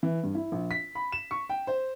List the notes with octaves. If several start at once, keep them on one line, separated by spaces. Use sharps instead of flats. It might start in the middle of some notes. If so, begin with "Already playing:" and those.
E3
G2
E4
A#1
B6
B5
E7
C#6
G5
C5